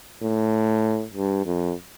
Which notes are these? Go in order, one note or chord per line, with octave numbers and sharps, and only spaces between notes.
A2
G2
F2